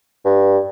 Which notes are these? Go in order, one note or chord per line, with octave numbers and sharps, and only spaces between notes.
G2